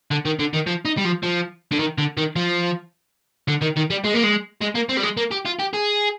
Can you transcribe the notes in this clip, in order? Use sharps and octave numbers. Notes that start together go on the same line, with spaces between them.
D3
D#3
D3
D#3
F3
D#4
G3
F3
F3
D3
D#3
D3
D#3
F3
D3
D#3
D#3
G3
G#3
A#3
G#3
G#3
A#3
C4
G3
G#3
A#3
G4
F4
G4
G#4